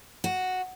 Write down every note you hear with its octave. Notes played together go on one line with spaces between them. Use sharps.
F#4